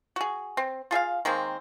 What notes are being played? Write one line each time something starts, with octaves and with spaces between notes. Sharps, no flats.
F#4 G#4
C4
F4 G#4 E5 F5
D#3 G#3 A#3 C4